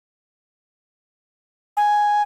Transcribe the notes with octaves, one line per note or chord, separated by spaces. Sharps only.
G#5